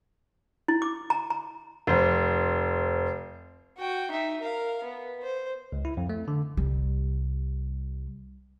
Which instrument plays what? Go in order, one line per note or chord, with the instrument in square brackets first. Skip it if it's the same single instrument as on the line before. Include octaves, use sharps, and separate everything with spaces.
[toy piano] E4
D6
A#5
A#5
[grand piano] F1 C5
[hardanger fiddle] F#4 G5
D#4 E5
A#4 F5
B3
C5
[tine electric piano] C#2
E4
F2
A3
D3
[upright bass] C2 G3